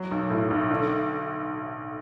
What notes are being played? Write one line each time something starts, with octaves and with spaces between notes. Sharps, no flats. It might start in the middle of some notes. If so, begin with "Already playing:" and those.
Already playing: F#3
B1
A2
B1
D3